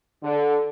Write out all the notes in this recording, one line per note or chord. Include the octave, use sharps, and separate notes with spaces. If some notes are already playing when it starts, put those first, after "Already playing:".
D3